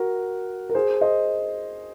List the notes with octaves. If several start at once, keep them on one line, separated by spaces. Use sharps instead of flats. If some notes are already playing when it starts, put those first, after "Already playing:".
Already playing: F#4 A#4
A#4
G#4 C5
C5 D#5